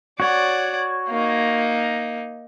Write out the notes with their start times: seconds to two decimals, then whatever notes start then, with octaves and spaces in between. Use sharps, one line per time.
0.20 F#4 C#5 D5 F#5
1.10 A#3 D#4